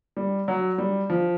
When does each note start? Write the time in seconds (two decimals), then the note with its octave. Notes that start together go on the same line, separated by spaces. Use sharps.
0.17 G3
0.48 F#3
0.78 G3
1.10 F3